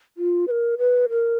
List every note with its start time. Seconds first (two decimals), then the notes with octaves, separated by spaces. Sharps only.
0.17 F4
0.47 B4
0.51 A#4
0.78 B4
1.10 A#4